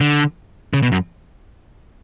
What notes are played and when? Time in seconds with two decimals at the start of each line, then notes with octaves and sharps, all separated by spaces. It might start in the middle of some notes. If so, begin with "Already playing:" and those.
0.01 D3
0.74 C#3
0.83 B2
0.92 F#2